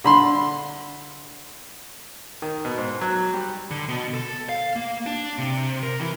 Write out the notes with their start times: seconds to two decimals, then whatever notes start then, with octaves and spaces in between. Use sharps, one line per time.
0.04 D3 B5 C6
2.42 D#3
2.65 B2
2.78 G#2
3.01 F#3
3.34 G3
3.71 D3
3.89 B2
4.14 A4
4.49 F5
4.76 A#3
5.06 D4
5.38 C3
5.83 A#4
6.00 E3